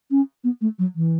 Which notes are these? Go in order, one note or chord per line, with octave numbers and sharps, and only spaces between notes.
C#4
B3
A3
F#3
E3